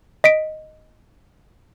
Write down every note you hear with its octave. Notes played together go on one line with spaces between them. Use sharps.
D#5 B6 D7